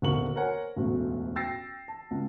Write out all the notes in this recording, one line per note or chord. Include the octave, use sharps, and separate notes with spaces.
D#1 B1 D3 A#4 C#6 F#7
A#4 C5 C#5 F#5 G#5
E1 A1 D2 A3
G5 E6 A6 A#6 C7
A5
C#2